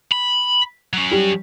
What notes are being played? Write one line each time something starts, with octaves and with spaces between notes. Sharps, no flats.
B5
F#3 C#4
G3